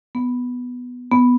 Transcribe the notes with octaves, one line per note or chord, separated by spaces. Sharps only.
B3
B3